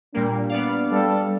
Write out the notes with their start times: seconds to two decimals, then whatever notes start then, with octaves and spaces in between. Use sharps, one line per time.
0.14 A#2 G3 A#3 D4
0.49 B3 D5 F5
0.91 G3 A4